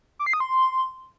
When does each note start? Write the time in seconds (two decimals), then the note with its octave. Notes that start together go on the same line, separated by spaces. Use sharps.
0.19 D6
0.26 C7
0.33 D#6
0.40 C6